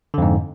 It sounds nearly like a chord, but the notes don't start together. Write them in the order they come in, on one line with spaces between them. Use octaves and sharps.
D3 F2 G#2